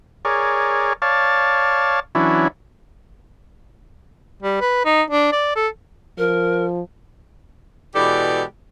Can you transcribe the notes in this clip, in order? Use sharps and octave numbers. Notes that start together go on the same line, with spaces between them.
G#4 A#4 C#5 D5
C#5 D5 F5 A5
E3 F#3 C#4 D4 E4
G3
B4
D#4
D4
D5
A4
F3 A#4
B2 E3 G#3 G4 A4 D5